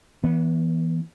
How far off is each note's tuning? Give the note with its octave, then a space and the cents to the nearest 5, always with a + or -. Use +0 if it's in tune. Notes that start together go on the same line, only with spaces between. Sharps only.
E3 +0 B3 -30